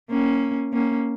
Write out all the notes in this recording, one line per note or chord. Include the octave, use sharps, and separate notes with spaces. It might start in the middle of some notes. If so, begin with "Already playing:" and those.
A#3 C#4
A#3 C#4